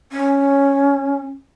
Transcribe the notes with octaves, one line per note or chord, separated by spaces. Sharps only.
C#4